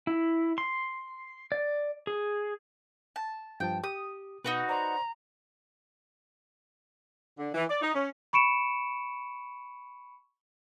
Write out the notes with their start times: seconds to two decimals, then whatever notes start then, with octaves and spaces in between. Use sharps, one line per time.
0.07 E4
0.58 C6
1.52 D5
2.07 G#4
3.16 A5
3.60 G2 F3 G5 A5
3.84 G4 D#6
4.44 B2 D#4 F#4 B4
4.69 C5 D5 A#5 C6
7.38 D3
7.54 E3
7.69 D5
7.82 D#4
7.94 C#4
8.33 B5 C#6 C#7 D7 E7